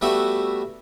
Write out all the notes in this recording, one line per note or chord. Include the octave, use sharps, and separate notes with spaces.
G3 A3 B3 F#4 E5